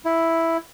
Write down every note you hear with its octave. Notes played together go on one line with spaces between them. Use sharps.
E4